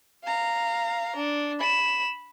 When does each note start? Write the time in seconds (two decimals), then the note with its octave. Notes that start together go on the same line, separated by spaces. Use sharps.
0.24 F5 A#5
1.16 D4
1.60 B5 E7